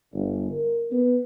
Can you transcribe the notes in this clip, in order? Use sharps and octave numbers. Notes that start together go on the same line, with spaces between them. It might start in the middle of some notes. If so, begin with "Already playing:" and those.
G1
A#4
B3